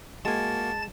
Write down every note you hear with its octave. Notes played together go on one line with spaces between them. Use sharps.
G#3 A#3 F#4 G#5 A5 A6